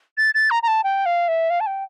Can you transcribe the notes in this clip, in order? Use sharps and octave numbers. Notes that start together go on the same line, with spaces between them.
A6
A6
A#5
A#5
A5
G5
F5
E5
F5
A5
G5